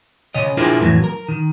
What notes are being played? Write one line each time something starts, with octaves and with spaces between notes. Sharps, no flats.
C#3 C#5 D#5
D4 E4 F4 G#4 A#4 C5
F2 A2 E3 F#3
A#4
D#3